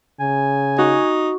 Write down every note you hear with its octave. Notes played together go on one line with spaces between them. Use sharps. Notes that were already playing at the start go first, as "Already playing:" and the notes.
C#3 G#5
D#4 F#4